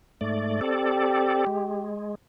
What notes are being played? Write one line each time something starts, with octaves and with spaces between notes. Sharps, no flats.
G#2 A3 D5
C4 G4 A4 D5
G#3